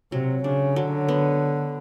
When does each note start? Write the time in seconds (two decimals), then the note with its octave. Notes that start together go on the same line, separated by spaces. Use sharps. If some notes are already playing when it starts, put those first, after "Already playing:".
0.12 C3 F#3
0.44 C#3 D4
0.76 D3 F#3
1.08 B3